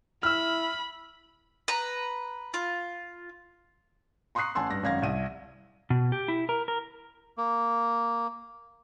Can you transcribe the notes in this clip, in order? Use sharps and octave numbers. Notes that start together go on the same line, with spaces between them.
E4 B5 E6 F6
B4 A#5
F4
A#5 C6 C#6 D#6 F#6 C7
A1 G#5 A5 C6 E6
G2 A#6
G#1 F#2 F5 G#6 A#6
C2 E5 D#7
B2
G4
E4
A#4
A#4
A#3